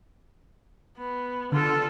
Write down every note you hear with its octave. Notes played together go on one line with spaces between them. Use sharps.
B3
D3 F4 A4